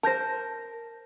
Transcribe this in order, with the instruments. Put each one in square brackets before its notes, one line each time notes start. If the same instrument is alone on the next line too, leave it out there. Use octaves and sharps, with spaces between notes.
[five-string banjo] A#4 C5 [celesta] A5 G6 A#6